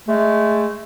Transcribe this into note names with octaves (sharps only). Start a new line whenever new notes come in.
G#3 A3